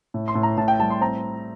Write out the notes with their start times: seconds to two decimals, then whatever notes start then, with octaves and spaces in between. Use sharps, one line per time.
0.14 A2
0.28 C6
0.35 A2
0.43 A#5
0.57 A2 A5
0.68 G5
0.79 G3 A5
0.90 C6
1.01 C4 A#5